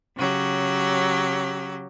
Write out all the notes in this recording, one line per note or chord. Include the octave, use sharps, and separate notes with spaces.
C#3 F#3 G4